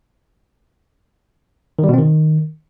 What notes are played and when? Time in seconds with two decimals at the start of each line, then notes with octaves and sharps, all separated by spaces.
1.79 D#3
1.84 G3
1.89 B2
1.94 C4
1.99 D#3